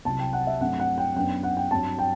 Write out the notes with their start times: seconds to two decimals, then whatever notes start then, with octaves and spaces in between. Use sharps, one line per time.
0.05 C2 C3 F#3 A5
0.19 G5
0.33 F#5
0.47 E5
0.60 G2 F#3 A3 C4 F#5
0.80 F#5
0.98 G5
1.16 F#2 F#3 B3 D4 G5
1.43 F#5
1.57 G5
1.71 G2 F#3 C4 A5
1.99 G5